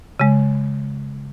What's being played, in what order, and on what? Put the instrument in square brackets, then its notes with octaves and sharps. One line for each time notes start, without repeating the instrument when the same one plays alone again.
[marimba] C#3 G#3